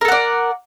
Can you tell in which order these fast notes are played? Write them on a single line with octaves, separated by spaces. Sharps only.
A#4 A4 F#5 D5